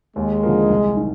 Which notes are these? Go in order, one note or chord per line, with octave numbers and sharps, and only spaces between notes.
D#2 G#3
D3 F3 A#3
C2
D#3